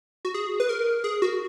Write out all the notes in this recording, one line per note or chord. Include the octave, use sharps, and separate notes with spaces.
F#4
G#4
B4
A#4
G#4
F#4